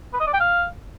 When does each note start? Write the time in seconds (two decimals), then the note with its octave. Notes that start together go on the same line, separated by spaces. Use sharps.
0.13 B4
0.20 D#5
0.27 D5
0.33 G5
0.40 F5